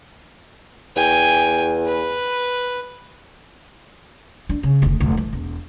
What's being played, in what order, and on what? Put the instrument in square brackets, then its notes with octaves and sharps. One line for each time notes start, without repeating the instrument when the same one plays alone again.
[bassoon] E2 [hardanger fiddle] G5 G#5
[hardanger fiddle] B4
[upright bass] D4
C#3
F1 D2
F1 D2
E3
E1